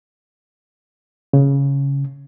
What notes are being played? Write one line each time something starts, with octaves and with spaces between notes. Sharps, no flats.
C#3